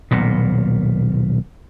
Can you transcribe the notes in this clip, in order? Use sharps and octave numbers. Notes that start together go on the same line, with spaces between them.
D#1 B1 A#2